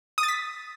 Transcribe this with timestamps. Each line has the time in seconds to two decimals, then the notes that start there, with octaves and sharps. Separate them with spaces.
0.18 D#6
0.23 A6
0.28 B6